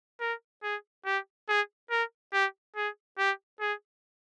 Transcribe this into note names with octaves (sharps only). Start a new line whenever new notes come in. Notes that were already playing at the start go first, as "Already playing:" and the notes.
A#4
G#4
G4
G#4
A#4
G4
G#4
G4
G#4